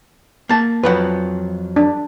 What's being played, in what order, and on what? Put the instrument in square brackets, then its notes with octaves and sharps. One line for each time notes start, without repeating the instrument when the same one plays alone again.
[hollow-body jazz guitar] A#3 A5
[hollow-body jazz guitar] F2 F3 F#3 [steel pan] B4
[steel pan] D4